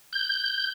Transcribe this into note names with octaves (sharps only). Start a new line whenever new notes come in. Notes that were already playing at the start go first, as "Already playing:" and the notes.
G6